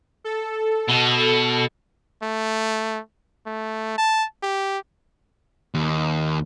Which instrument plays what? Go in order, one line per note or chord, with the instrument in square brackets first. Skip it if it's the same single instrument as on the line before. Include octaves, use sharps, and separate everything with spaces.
[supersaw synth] A4
[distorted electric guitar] B2
[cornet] A3
A3
A5
G4
[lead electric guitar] D#2